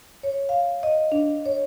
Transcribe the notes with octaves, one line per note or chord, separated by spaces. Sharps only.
C#5
F5
D#5
D4
C#5